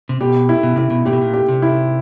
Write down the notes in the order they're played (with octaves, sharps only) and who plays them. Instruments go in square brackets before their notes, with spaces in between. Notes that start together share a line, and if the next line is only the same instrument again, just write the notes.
[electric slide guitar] C3
[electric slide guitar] B2 [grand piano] G4
[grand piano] E4
[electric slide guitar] B2
[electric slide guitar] C3 [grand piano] E4
[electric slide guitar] B2
[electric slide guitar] A#2 [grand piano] G4
[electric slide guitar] B2
A#2
[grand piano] G4
[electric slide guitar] C3
[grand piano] E4